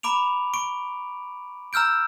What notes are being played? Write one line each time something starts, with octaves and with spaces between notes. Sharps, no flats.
A#5 B5 D6 D7 F7
C#6 D7
A#5 E6 F6 G6 D7